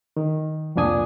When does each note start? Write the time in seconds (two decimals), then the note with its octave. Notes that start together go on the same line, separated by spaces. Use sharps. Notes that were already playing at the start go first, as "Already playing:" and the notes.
0.17 D#3
0.75 C2 F2 A#2 D4 G#5 D#6